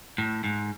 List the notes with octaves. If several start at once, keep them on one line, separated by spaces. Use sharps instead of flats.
A2
G#2